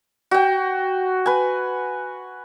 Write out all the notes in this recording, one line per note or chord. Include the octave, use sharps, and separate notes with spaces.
F#4 G5
B4 G#5